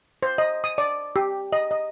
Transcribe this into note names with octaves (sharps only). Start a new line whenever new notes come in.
C5
D#5
D#6
D5
G4
D#5
D#5